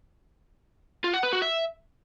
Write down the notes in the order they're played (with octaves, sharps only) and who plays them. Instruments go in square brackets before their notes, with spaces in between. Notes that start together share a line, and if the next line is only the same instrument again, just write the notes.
[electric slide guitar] F4
F#5
B4
F#4
E5